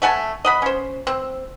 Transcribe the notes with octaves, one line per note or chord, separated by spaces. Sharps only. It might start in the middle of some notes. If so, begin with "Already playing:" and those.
A3 F#5 G#5 A5
D#5 F#5 B5
C#4 C5
C4